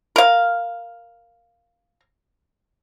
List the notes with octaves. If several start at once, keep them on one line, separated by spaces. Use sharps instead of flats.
A#4 F5